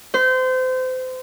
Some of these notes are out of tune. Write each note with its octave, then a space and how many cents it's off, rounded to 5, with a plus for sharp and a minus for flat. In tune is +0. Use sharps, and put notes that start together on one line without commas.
C5 -30